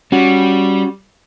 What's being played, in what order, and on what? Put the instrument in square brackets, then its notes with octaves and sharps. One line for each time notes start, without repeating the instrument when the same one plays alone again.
[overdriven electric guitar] G3 [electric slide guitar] C#4 F#4